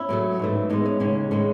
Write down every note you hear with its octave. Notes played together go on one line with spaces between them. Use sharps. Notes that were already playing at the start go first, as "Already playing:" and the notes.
Already playing: C#4 E4
A2 F#3 A3
G#2 E3 A3
A2 G#3 B3 D#4
C#4
D#2 C#3 G#3 C#4
A2 G#3 C#4